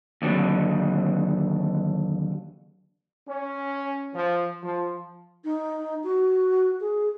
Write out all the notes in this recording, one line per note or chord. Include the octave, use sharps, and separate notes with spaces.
D#2 D3 F3 F#3
C#4
F3
F3
D#4
F#4
G#4